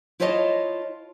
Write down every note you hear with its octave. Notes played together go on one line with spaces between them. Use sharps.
E4 F4 C5 C#5 D#5 A5